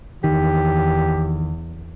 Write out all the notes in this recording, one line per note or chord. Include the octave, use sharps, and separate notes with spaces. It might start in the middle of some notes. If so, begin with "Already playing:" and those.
E2 D#3 G4